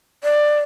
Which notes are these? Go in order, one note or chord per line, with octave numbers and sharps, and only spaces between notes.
D5